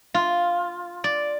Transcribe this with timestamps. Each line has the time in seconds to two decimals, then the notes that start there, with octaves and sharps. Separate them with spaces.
0.14 F4
1.04 D5